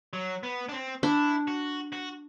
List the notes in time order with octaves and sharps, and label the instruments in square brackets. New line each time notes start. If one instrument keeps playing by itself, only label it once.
[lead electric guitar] F#3
B3
D4
C4
[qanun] D4 [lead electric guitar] E4
[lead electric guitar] F#4
F#4